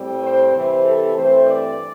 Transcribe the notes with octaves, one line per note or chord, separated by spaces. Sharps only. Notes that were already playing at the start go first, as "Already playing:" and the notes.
Already playing: A2 G3 C4
C5
C3 E3 C4 C5
A4
G2 E3 A3 C4 C5
D5